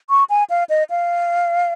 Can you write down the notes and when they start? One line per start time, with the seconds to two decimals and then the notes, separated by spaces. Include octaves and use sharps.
0.10 C#6
0.30 G#5
0.50 F5
0.69 D#5
0.90 F5